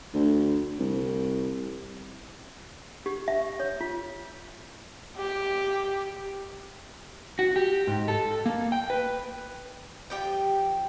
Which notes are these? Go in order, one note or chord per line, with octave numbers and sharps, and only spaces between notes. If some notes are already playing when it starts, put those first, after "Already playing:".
D2
C2
G4
E5
C#5
F4
G4
F#4
G4
G#2
A4
A#3
G5
B4
F3 G4 G5